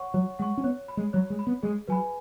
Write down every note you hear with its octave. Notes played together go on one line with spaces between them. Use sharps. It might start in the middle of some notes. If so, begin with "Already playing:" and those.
Already playing: C#5 F#5 C#6
F#3 C#5
G#3 F#5 C#6
C#4
B3 C#5
B5
G#3
F#3 C#5
G#3
B5
B3
G#3 G#4
F#3 B4 G#5 B5